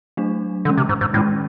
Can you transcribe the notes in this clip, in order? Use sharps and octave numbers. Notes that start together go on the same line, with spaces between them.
F#3 A3 D4
D3 E3 G#3 C#4
C3
G#2
G#2
A2 D#3 G#3 C#4